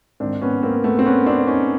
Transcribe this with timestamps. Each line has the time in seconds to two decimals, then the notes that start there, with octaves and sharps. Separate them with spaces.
0.20 G#2 D#3 C4 D4
0.41 B3 C#4
0.63 A#3 C4
0.84 A3 B3
0.99 C4
1.05 B3 C#4
1.26 C4 D4
1.47 C#4 D#4